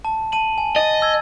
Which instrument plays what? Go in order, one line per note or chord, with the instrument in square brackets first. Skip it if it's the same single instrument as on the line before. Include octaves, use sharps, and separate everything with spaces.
[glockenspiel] A5
A5 D#7 F#7
G#5
[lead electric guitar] D#5 [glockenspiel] A6
[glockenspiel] E6 G#6